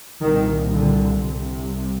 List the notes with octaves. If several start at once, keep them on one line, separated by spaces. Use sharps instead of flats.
C2 A#2 D#3
D3
C2 C3